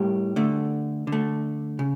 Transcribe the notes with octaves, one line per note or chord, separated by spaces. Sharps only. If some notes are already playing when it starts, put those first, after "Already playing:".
Already playing: A2 G3 G4 A#4
D3 A3
D3
A3
C#3